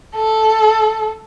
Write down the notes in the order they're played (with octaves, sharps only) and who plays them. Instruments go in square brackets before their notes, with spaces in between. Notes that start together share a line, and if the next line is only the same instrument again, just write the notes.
[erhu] A4